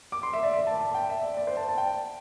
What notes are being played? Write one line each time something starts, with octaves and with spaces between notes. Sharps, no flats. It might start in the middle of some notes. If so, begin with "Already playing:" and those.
D6
C6
E5
D5
E5
A5
A5
G5
E5
D5
D5
C5
A5
A5
G5